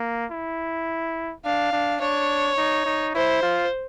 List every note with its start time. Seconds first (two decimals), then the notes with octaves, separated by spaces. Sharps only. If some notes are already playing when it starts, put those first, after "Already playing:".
Already playing: A#3
0.31 E4
1.45 D4 F5
1.73 D4
2.01 D4 C#5
2.57 D#4
2.86 D#4
3.15 E4 C5
3.43 F4